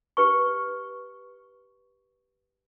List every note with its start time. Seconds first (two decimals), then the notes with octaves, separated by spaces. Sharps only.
0.17 G4 B4 C#6